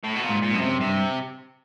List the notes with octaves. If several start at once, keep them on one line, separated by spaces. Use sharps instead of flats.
A2
B2
A#2
G#2
A#2
F#2 B2
C3
G2 C3